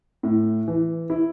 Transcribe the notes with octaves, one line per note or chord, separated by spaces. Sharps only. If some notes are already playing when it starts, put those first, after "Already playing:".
A2
E3
E4